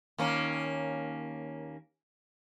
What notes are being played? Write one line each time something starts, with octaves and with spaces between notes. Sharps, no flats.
D#2 A#3 C#4